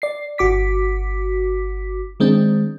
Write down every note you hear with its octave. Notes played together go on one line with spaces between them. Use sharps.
D5 C7
G1 F#4 D6 B6
D#3 G#3 C4 D4